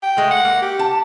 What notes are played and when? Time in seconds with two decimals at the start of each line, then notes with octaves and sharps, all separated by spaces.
0.03 G5
0.17 G#3 A3
0.31 F#5
0.45 A#3
0.62 G4
0.79 A5